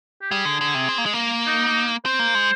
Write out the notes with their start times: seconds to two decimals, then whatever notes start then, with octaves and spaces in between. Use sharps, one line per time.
0.22 G4
0.31 G3 G#4
0.45 D3
0.61 D3
0.75 C3
0.89 C4
0.98 A#3
1.06 G#3
1.13 A#3
1.47 D#4
2.05 C4 C5
2.19 A#3
2.35 G#3